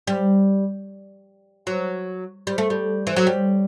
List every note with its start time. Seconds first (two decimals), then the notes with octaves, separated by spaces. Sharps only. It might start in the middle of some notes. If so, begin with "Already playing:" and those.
0.07 G3
1.67 F#3
2.47 G3
2.58 A3
2.70 G3
3.07 E3
3.16 F#3
3.27 G3